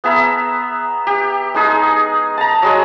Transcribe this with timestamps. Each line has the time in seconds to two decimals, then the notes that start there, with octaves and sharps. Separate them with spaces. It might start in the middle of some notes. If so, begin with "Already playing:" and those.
0.04 B3 G#4 E5 A#5
1.07 G4
1.54 G#3 D#4 G#4
2.37 A5 A#5
2.62 F#3 G#3 G#4